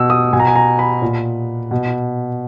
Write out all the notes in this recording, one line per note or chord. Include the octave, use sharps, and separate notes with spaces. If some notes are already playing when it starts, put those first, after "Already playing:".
Already playing: B2 E6
D#6
B2 G#5
A#5
G#5
A#5
B5
A#2
B2